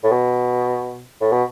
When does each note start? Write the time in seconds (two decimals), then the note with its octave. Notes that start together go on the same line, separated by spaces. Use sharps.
0.04 A2
0.12 B2
1.21 A2
1.32 B2